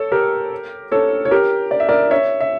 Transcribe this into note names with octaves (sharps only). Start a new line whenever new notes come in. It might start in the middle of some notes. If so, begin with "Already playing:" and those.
Already playing: A4 C#5
G4 A#4
A4 C#5
C#5
G4 A#4
D5
E5
A#4 D5
C#5 E5
E5